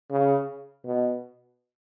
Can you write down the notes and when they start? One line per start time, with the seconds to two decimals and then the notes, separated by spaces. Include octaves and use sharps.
0.11 C#3
0.85 B2